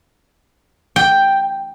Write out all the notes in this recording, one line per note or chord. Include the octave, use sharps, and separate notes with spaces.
G5